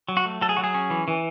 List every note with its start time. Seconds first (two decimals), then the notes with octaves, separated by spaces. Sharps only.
0.09 F#3
0.17 F#4
0.26 A3
0.41 F#3 A4
0.49 G#4
0.57 F#3 F#4
0.64 G#4
0.74 C#4
0.90 E3
1.08 E3